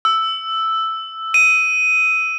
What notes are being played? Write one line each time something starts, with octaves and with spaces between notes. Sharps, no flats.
E6
D#7